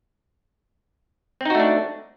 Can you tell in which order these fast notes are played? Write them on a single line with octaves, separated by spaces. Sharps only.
C4 D#4 F#4 A3 D4